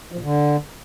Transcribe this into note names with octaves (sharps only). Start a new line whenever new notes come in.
F3
A#2
D3